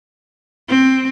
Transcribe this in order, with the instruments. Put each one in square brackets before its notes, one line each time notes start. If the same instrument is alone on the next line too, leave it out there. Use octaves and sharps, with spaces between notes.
[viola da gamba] C4